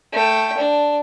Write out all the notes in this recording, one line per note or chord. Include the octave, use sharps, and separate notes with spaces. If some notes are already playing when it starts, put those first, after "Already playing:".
A3 G5
D4